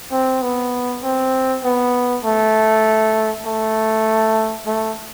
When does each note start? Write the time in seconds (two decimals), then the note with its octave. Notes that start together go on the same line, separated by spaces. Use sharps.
0.11 C4
0.42 B3
1.03 C4
1.64 B3
2.24 A3
3.45 A3
4.66 A3